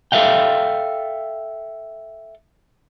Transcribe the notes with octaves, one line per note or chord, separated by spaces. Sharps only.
A4 B4 E5 F5 G5